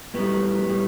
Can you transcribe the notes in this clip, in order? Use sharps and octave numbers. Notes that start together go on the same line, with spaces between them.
A2 G3 B3
A2 G3